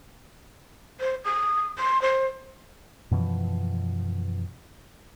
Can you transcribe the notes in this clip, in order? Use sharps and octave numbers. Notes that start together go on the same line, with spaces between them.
C5
D#6
C6
C5
F#2 B2 E3 F3